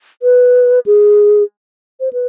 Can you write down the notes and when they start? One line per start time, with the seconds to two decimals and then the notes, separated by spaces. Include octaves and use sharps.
0.22 B4
0.86 G#4
2.00 C5
2.13 B4